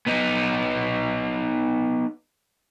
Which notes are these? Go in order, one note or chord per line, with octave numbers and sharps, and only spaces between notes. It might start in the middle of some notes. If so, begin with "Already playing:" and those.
B3 D#4